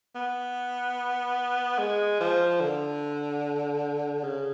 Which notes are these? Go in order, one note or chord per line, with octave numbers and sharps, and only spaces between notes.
B3
G#3
F3
D3
C#3